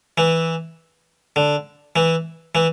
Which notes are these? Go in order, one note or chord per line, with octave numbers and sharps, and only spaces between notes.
E3
D3
E3
E3